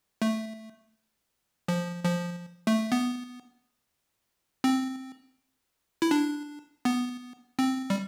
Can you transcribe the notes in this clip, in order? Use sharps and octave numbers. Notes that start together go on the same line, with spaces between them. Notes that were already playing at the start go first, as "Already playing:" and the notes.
A3
F3
F3
A3
B3
C4
E4
D4
B3
C4
G3